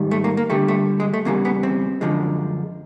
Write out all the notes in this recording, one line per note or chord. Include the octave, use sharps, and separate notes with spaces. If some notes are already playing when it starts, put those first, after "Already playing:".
Already playing: G#2 D#3 G3
A3
A#3
A#3
G2 D3 G3 A3
A3
G#3
A3
E2 C#3 E3 G3 A#3
B3
C4
F#2 D3 F3 G#3